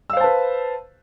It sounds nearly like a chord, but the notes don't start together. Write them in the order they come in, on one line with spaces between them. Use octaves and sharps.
E6 F5 C5 A5 B4